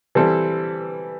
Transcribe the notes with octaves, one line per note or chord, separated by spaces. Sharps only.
E3 G3 C4 E4 A4